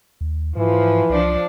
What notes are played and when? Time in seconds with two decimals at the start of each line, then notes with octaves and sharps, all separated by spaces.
0.21 D#2
0.57 G#2 E3 F3
1.10 C2 F3 D4